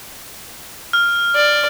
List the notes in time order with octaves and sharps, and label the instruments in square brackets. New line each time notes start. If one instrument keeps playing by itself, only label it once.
[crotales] F6
[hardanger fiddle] D5